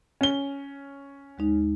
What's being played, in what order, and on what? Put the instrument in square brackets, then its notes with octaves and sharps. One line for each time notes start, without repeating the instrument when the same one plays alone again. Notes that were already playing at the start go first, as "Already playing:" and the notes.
[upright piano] C#4 G7
[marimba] D#2 G#3 D#4